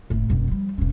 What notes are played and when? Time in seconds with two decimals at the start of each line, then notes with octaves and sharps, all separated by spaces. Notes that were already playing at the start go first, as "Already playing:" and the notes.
0.10 F#1 A2
0.30 E1 F#2
0.48 F3 G3
0.78 E1 C#4